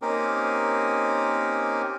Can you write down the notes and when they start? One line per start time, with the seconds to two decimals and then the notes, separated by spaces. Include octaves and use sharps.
0.02 A#3 C4 C#4 D#4 G4 A#4